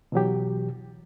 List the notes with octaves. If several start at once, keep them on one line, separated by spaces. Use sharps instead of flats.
B2 E3 F#3 G4